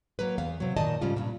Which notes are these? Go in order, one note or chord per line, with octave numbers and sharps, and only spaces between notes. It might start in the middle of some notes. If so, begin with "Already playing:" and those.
F#3 A#3 B4
E2 B3 F5
C3 F#3
F#2 A#2 D#3 D5 D#5 A5
G#2 C#3 G3 F4
G2 A#2